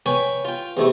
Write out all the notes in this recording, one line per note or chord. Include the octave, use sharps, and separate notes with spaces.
B4 C#5 G5 G#5 B5 C#6
F4 G5
E2 C3 A3 E4